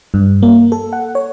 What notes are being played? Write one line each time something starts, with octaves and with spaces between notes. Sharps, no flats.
G2
A#3
A4
F#5
C#5